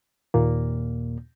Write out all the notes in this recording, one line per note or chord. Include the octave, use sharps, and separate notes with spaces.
D#2 A#2 A#3